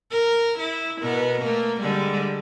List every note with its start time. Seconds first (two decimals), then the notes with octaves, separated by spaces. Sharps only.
0.11 A#4
0.59 E4
1.00 B2 B3 A#4
1.42 A3 A#3
1.80 D3 G3 G#3